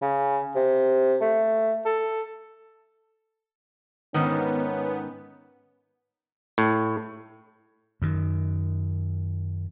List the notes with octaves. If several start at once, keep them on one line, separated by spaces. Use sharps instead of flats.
C#3
C3
A3
A4
G#2 D#3 B3 C#4
A2
F#2 D#3